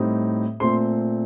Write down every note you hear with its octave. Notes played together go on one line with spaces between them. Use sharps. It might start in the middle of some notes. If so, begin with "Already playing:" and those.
Already playing: A2 G3 C4 D#4
A#2 A3 C4 C6